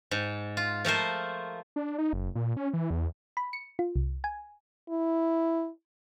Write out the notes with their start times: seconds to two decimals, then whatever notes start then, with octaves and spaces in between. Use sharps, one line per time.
0.11 G#2
0.57 F4
0.85 F3 A3 A#4 C5
1.76 D4
1.98 D#4
2.13 F#1
2.35 A#2
2.57 C#4
2.74 E3
2.90 E2
3.37 B5
3.53 C#7
3.79 F4
3.96 C2
4.24 G#5
4.90 E4